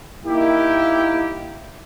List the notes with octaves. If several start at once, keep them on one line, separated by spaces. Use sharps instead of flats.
A#3 D#4 E4 G4